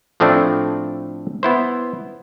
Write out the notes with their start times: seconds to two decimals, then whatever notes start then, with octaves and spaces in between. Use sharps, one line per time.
0.20 A2 F3 A3 C4 D4
1.43 B3 E4 C5